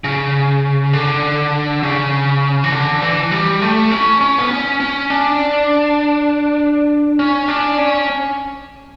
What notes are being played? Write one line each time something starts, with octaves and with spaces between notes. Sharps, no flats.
C#3
D3
C#3
E3
D3
E3
G3
A3
C#4
C#4
B3
C#4
C#4
D4
C#4
D4
C#4